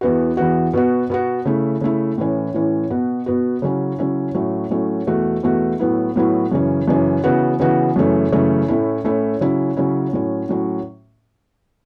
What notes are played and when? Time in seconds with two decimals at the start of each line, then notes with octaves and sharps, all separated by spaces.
0.01 E2 E3 B3 F#4
0.37 E2 E3 B3 F#4
0.73 B2 B3 F#4
1.10 B2 B3 F#4
1.45 C#3 A3 E4
1.81 C#3 A3 E4
2.18 A2 E3 C#4
2.54 A2 E3 C#4
2.90 B2 B3 F#4
3.26 B2 B3 F#4
3.62 C#3 F#3 C#4 E4
3.98 C#3 F#3 C#4 E4
4.35 A2 F#3 A3 C#4
4.71 A2 F#3 A3 C#4
5.07 E2 B2 A3 F#4
5.43 E2 B2 A3 F#4
5.79 A2 F#3 B3 E4
6.16 A2 F#3 B3 E4
6.52 F#2 C#3 E3 C#4
6.88 F#2 C#3 E3 C#4
7.24 C#3 E3 B3 F#4
7.60 C#3 E3 B3 F#4
7.96 F#2 C#3 E3 A3 C#4
8.32 F#2 C#3 E3 A3 C#4
8.68 A2 A3 C#4 E4
9.04 A2 A3 C#4 E4
9.41 C#3 F#3 C#4 E4
9.77 C#3 F#3 C#4 E4
10.13 A2 F#3 C#4
10.49 A2 F#3 C#4